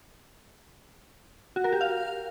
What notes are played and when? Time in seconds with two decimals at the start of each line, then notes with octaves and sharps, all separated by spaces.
1.56 F#4
1.64 A#4
1.73 G4
1.81 F5